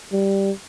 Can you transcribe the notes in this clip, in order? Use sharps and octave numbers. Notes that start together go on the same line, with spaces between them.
G3